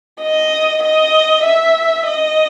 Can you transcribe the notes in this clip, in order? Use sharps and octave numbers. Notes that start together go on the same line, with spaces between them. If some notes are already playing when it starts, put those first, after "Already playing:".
D#5
D#5
E5
D#5